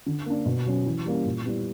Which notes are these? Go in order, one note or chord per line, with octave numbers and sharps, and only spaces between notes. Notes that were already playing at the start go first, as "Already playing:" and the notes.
D3
A#3 D4
B2
F#3 C#4
E3
G3 A#3 C#4
A#2
G3 B3 E4